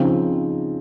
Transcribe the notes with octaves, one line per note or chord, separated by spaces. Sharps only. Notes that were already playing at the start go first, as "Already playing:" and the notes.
Already playing: C#3 F3 C4 D#4